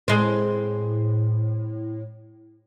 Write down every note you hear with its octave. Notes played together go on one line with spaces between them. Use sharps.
A2 G#3 C4